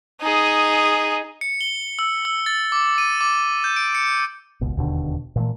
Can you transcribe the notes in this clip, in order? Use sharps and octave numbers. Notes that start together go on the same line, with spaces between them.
D#4 G#4
C#7
G7
E6
E6
A6
D6
D#7
D6
G6
D7
C#7
F#1 C#2 B2
E1 D#2 B2 D3
A#2 E3 A3